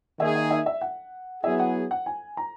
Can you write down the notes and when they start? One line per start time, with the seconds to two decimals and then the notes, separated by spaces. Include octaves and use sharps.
0.19 D#3 A#3 D#4 G#4 E5
0.35 E5
0.51 E5
0.66 E5
0.81 F#5
1.44 F#3 B3 E4 G#4 E5
1.60 F#5
1.91 F#5
2.06 G#5
2.37 A#5